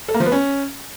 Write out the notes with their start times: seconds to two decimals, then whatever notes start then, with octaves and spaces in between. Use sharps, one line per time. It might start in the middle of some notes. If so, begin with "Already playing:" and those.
0.08 A4
0.14 A#3
0.20 F3
0.26 B3
0.32 C#4